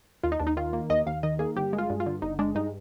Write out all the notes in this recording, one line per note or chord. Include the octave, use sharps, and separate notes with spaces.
D#2 F4
D#4
D#2 D4
D#4
D#3 F4
A#3
D#2 D#5
D#2 F5
D#3 D#5
A#3 G#4
G1 G4
G#3
F4
G2
F4
D3
G1 D#4
G#3 D4
G2 D#4